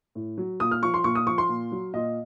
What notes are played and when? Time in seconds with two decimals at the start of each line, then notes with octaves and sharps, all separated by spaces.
0.15 A2
0.38 F#3
0.60 A#2 D#6
0.71 F6
0.82 F3 C#6
0.94 C6
1.04 A#2 C#6
1.15 D#6
1.27 F3 C#6
1.38 C6
1.49 A#2
1.72 F#3
1.94 A#2 D#5